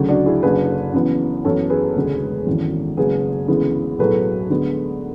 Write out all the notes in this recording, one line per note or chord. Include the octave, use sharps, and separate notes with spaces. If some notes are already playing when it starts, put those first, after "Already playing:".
Already playing: D2 C#3 F#3
D4 F#4
E4 G#4
F#1 F#2 D3 F#3 G#4 B4
F#2 C#3 E3 B3
F#2 E3 B3 A4 C#5
G#4 B4
E1 D2 C#3 G#3 B3
G#1 F#2 E3
F#1 F#2 C#3 G#3 G#4 B4
D2 C#3 E3 G#3 B3
B1 A2 F#3 A3 G#4 B4
D2 D3 G#3 B3